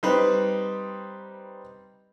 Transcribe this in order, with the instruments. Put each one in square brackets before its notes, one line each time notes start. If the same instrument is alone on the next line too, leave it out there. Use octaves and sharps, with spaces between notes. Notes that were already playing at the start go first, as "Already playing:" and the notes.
[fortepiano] G3 C4 D#4 B4